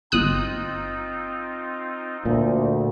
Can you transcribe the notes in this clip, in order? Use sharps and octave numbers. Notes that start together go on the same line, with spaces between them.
G1 C4 D#4 F4 D#6 F#6
D2 A#2